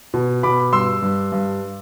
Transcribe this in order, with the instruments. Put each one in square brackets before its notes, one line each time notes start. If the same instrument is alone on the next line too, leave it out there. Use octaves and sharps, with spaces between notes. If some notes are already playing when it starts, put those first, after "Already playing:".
[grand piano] B2
B2 B5 D6
G2 C6 E6
G2
G2